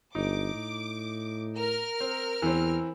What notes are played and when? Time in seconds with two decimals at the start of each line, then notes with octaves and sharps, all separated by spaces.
0.15 G1 D#4 D6
0.54 A2
1.56 A#4 F6
2.00 C4
2.42 E2 E3 C4